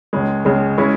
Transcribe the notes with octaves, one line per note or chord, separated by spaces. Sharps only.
C#2 C#3 G#3
C#2 C#3 G#3
C#3 G#3 C#4 E4